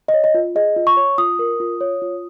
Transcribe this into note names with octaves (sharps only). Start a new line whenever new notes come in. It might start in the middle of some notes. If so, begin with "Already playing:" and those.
D#5
C#5
D#5
F4
G#4 D#5
F4
C#6
C#5
F4 D#6
A#4
F4
C#5
F4